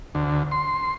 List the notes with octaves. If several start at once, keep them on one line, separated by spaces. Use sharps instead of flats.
D2
C6